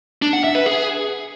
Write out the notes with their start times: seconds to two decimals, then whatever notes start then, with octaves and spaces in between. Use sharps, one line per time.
0.22 D4
0.33 F#5
0.44 E5
0.55 B4
0.66 G#4